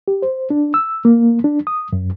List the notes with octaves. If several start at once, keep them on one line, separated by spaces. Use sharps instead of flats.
G4
C5
D4
E6
A#3
D4
D#6
F#2